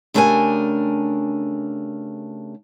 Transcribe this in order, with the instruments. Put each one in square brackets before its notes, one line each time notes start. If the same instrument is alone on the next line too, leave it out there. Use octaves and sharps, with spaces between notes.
[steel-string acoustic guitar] C#3 A3 D4 G4 A#4 G#5